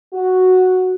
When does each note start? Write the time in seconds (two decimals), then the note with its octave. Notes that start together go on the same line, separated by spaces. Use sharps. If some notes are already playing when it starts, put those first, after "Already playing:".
0.14 F#4